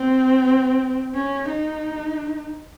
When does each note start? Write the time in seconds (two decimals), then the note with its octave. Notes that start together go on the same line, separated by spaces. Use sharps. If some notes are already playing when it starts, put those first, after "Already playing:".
Already playing: C4
1.15 C#4
1.49 D#4